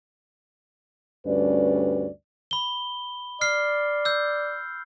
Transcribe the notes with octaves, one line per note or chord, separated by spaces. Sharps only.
D2 G2 G3 C#4 B4 D5
B5 G7
D5 F6 C7
E6 G6